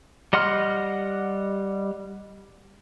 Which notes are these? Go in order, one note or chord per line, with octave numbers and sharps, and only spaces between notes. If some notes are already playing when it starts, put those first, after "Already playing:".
G3 D#5 F#5 C6 F6